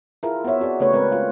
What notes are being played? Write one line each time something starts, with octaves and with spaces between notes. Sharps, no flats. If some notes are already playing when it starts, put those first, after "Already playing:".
E4 F4 G#4 A#4
B3 F#4 C5 C#5 E5
C4 F#4 G#4 D5
C#3 A3 B3 G#4 B4 C#5
G#3 C4 A#4 B4
F4 F5